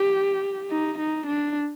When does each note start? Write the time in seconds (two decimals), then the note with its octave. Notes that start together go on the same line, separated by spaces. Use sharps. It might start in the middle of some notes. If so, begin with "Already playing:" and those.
Already playing: G4
0.70 D#4
0.98 D#4
1.27 D4